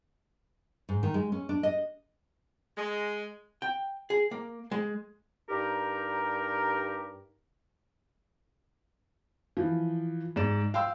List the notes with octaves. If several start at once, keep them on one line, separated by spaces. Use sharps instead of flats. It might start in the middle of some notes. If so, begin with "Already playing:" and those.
G#2
D#3
G#3
C#4
D4
D#5
G#3
G5
G#4
A#3
G#3
G2 D#4 G4 A#4
E3 F3
G#2 G#3 D5 E7
F5 G5 C6 E6